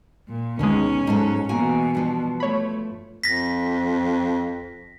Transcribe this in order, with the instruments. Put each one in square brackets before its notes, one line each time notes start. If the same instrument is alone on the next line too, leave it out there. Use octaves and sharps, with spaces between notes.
[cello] A#2
[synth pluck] D2 G#3 [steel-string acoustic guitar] B2 D#3 [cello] C#4
[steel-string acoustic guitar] G#2 F#3 A4
[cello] B2 E3 [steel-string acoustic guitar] A#3 F#4 G#5
[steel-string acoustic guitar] G2 F3
[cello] A3 [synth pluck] C#5 B5
[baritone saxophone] F2 [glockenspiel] A#6 B6